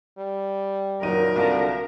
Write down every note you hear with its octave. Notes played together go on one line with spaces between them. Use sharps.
G3
F#1 A#2 D#3 F#3 D#4 A#4 D#7
C2 G2 D3 F4 F#4 A5